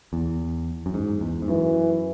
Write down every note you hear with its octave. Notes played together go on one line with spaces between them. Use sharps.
E2
F#2
G#2
E2
G#2
F#2 E3